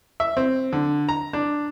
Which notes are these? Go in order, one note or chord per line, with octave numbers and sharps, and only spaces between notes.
E5
C4
D3
A#5
D4